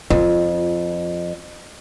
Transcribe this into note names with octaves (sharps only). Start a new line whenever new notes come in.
F2 F4